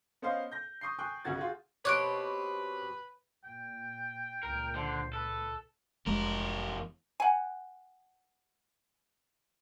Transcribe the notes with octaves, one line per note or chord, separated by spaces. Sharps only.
B3 C#4 C5 D#5 F5
G6 A#6
C#6 D#6 G6 C7
G5 G#5 C#6 D#6 F#6 G6
B1 C#3 B3 F#4 G#6 A6
F4 F#4 G#4
B2 C4 G4 B4 C#5 D6 F#6 D7
A#2 G5
C#2 A#2 A#4
D3 C5
A4 B4
F1 E2 G#3 A#4
F#5 G#5